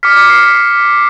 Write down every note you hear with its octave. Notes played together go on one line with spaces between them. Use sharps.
D6 F6 B6 C#7
B6 C#7
C7
B6